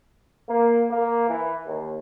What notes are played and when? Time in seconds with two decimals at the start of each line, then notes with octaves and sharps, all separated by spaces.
0.49 A#3
0.90 A#3
1.28 E3
1.66 D#2